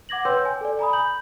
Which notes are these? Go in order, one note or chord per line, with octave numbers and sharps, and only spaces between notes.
F#5 D6 G#6 A#6 F#7
B4 C#5 G5 C6 E6 G6
G#5
A4 D5
G#5 A#5 B5 D#6
B5 G6 F#7